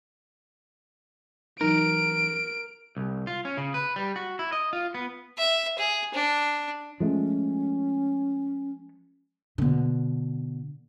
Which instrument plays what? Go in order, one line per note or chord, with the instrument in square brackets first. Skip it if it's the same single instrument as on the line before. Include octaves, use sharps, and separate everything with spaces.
[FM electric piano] E3 F#3 D#4 [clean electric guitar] A#4 [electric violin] D7
[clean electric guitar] C2
F4
C#4
C#3
B4
G3
F#4
E4
D#5
F4
B3
[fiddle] E5
G#4
D4
[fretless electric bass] F3 G#3 A3 [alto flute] C#4
[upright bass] B2 D3